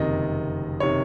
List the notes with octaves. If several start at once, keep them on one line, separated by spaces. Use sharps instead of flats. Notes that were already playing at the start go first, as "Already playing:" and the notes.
Already playing: F#1 F2 C3 D#3 D#5
C3 D#3 C#5